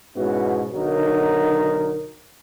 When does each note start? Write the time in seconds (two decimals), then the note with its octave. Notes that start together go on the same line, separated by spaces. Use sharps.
0.16 G#2 B2 B3 C#4 E4 F#4
0.73 B1 D3 F#3 D#4 A#4